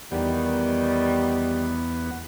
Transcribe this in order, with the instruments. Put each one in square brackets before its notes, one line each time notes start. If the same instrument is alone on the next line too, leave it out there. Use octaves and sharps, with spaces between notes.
[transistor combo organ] E2 B3 [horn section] D#3 G3